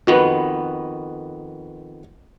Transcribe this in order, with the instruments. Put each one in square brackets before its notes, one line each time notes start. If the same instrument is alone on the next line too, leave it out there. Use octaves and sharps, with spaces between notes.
[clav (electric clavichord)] F2 D#3 B3 [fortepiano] F#4 B4